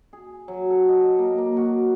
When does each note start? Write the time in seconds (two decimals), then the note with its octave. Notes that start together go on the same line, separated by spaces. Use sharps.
0.13 G#4
0.48 F#3
0.70 A4
0.89 D#5
1.19 A#3
1.38 A#3
1.57 F#4